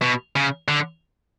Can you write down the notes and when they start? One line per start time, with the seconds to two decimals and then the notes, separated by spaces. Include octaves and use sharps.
0.02 B2
0.36 C#3
0.68 D3